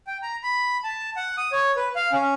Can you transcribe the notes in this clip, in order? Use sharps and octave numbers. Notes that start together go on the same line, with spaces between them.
G5
A#5
B5
A5
F#5
D#6
C#5
B4
F5
C#4